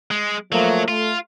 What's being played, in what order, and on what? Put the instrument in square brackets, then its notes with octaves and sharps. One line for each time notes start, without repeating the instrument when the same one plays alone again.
[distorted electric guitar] G#3
[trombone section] F3 A3 A#3 [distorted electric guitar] F#3
[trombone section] A3 [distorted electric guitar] F4